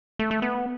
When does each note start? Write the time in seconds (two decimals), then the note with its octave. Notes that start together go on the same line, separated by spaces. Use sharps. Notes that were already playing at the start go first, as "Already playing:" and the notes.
0.19 A3
0.31 A3
0.42 B3